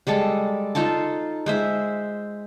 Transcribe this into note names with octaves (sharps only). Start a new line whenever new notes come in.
G3 G#3 A4 A5
D#4 F4 A4 A5
G#3 C5 E5